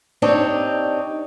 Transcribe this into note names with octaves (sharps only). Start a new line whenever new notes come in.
C4 D4 D#4 G4 C#5